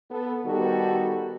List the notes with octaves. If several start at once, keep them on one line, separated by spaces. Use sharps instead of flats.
B3 A4
D#3 G3 B3 F#4 G4 A4